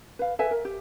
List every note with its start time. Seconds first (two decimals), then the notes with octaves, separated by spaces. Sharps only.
0.19 B4 F5
0.39 A4 B4 E5 G#5
0.51 A#4
0.65 G4